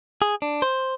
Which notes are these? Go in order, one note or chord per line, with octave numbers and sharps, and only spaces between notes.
G#4
D4
C5